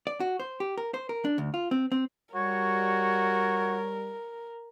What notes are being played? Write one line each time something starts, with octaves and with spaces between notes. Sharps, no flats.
D5
F#4
C5
G4
A#4
C5
A#4
D4
D2
F4
C4
C4
G3 F#4 A#4 C#5